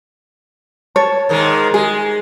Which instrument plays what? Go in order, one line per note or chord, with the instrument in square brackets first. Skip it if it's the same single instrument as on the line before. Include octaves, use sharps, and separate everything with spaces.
[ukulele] C#5 [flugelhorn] A5
[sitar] G#2 D#3 G#3 [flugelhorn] A#4
[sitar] G#3 [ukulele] G#4